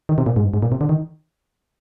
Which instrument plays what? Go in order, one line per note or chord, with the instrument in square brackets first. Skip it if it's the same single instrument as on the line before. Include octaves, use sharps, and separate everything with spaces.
[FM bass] D#3
C3
A#2
G#2
G2
G#2
A#2
C3
D3
D#3